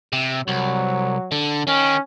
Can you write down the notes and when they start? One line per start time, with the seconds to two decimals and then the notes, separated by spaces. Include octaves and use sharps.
0.13 C3
0.48 C2 F#3
1.31 D3
1.67 D#3 C#4